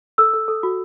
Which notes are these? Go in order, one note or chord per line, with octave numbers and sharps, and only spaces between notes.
A4 E6
A4
A4
F#4